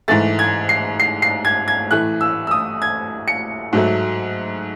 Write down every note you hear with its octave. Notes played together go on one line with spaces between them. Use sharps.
G#2 E3 A3 A6
G#6
C7
C7
C7
G#6
G#6
A2 E3 A3 F#6
E6
E6
D#6
G#6
C#7
G#2 F#3 A3